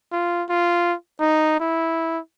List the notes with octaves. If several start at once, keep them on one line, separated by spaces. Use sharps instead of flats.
F4
F4
D#4
E4